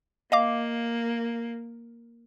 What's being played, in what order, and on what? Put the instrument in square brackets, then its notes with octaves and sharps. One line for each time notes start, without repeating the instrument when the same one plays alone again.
[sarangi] A#3 [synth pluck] D#5 F5 D6